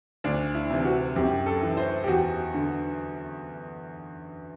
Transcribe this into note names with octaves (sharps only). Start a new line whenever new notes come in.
D2 D4
E4
C3 E3
F#4
F#2 G4
A4
E3
C5
G4
E2 F#4
D3